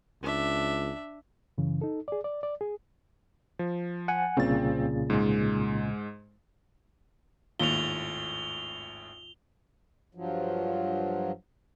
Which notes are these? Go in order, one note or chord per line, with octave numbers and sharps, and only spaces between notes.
C#2 D4 E5
F#2 C#3 E3
D#4 A4
G#4 D5
D5
D5
G#4
F3
F#5 G#5
C2 A#2 C#3 C4 A6
G#2 G#3
G#1 D#2 A2 F4 F7 G7
G2 F3 F#3